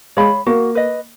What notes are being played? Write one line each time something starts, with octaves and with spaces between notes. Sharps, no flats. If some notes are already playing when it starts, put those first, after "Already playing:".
G#3 C#5 F5 B5
A#3 F#4
B4 D#5